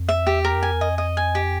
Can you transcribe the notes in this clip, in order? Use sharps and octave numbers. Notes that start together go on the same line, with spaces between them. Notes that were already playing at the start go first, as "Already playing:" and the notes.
Already playing: F2
E5
E2 G4
A#4
F2
G#5
E2
F2 D#5
D#5
G#5
G4